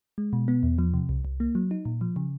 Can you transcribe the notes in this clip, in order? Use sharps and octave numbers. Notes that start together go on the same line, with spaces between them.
G#3
B2
B3
E2
F3
C3
C2
C2
A#3
F#3
D#4
A#2
F3
C#3